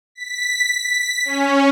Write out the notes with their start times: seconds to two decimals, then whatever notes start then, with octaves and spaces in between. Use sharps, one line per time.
0.15 B6
0.78 B6
1.25 C#4